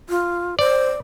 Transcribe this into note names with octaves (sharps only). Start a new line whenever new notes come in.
F4
C5 D5